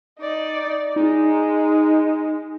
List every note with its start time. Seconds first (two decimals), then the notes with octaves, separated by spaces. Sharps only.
0.20 D#4 D5
0.96 G#3 D#4